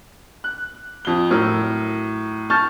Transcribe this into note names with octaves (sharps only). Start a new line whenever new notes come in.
F#6
F2 G7
A2 F#3 A#4 E6
A5 C#6 F6 G6 A6